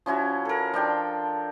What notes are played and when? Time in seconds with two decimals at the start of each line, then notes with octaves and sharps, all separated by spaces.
0.06 F3 C#4 E4 F#4
0.45 A4 A#4
0.74 F3 D4 G5 C6